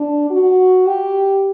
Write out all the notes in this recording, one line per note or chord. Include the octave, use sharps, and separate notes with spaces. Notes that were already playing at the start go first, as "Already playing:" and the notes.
Already playing: D4
F#4
G4